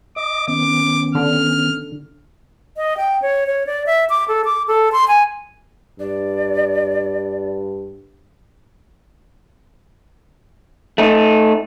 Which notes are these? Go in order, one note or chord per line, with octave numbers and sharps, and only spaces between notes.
D#5 D6 D#6
D#3 B3 C#4 D6
D3 F6
D#5
G5
C#5
C#5
D5
E5
D6
A4
D6
A4
C6
G#5
G2 D5
A3 D#4